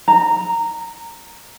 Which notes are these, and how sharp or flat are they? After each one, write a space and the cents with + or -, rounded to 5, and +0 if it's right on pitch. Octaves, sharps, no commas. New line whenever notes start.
A#5 -15